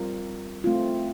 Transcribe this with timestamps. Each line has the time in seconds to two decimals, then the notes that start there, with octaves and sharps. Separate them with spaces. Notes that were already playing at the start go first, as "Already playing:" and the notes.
Already playing: G3 C4 F4 A#4
0.64 A3 C4 F4